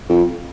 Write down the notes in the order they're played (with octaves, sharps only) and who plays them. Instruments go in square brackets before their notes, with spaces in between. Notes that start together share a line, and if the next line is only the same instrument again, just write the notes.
[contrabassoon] F2